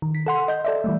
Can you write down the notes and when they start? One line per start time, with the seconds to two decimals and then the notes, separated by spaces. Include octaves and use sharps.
0.02 D#3
0.15 B6
0.26 A4 F#5 C6
0.48 D#5 G6
0.64 A4 D5 E5
0.84 E3 G3 A3